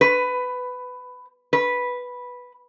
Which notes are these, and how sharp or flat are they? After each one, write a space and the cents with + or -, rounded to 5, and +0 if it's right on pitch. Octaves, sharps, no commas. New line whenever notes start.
B4 +15
B4 -5